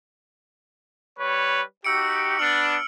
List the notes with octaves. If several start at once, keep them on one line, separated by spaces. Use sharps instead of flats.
G3 B4 C#5
D#4 F#4 G4 E6 C#7 D7
B3 D4 F6 F#7